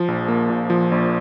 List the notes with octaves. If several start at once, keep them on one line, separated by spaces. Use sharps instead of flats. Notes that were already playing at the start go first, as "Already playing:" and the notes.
Already playing: F3
A#1
A#3
A#2
F3
A#1